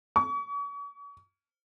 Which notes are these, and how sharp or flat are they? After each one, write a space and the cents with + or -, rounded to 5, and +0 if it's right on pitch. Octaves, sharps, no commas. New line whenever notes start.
C#6 +40